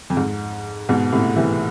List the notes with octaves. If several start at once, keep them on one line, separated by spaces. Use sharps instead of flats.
F2
G#2
G#2 B2
A2 C3
C3 E3